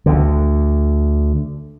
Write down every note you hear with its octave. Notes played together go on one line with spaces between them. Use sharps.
D2 D3